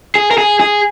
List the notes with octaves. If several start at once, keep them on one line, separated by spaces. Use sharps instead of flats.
G#4
A#4
G#4
G#4